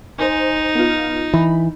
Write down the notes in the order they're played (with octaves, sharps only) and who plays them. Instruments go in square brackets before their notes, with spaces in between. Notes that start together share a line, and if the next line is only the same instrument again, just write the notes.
[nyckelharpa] D#4 [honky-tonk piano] C5 G#5
[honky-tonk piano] B3 F4
[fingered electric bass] E3 [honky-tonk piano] B5